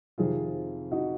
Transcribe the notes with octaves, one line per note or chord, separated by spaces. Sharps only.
F2 C3 D#3 F4 G#4
D#4 F#4